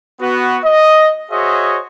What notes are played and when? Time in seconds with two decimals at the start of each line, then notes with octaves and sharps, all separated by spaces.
0.21 B3 F#4
0.65 D#5
1.31 F#4 G#4 C5 C#5 D#5 E5